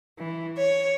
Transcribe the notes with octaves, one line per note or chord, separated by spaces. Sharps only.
E3
C#5